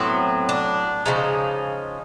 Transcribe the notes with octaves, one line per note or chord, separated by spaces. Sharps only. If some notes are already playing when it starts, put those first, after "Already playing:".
Already playing: A2 F#3 B3 C4
D4
C#3 F3 G#3 D#4